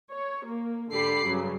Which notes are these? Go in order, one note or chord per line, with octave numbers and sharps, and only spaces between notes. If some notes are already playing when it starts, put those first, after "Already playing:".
C#5
A#3
G#2 D3 G4 B5 D6 C7
G2 C#3 F#3